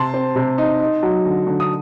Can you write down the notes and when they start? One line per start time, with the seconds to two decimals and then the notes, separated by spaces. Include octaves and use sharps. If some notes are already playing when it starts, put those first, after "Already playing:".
Already playing: C3 A5 C6
0.14 C4
0.36 C3
0.58 D#4
0.80 D#4
1.03 F#3
1.25 D3
1.47 D3
1.60 D#6